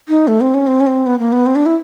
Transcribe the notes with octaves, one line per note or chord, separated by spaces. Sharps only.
D#4
A3
C4
C#4
C4
C#4
C4
B3
A#3
B3
C4
D4
E4